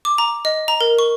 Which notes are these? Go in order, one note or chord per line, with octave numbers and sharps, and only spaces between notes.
D6
A#5
D#5
A#5
A#4
C#6